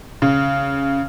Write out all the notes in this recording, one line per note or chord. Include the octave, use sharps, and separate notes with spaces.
C#3